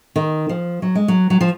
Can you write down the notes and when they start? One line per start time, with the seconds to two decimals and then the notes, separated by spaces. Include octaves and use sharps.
0.16 D#3
0.49 F3
0.82 F#3
0.95 G#3
1.08 F#3
1.30 F#3
1.41 F3